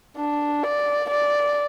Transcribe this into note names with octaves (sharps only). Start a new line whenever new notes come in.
D4
D5
D5